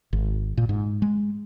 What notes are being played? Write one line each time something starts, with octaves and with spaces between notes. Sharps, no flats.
G#1
A#2
G#2
G#3